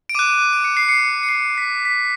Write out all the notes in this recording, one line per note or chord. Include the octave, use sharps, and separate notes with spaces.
D7
D6 F#6 D#7
D7
D7
C#7
C7
C#7
C#7
C7
B6
B6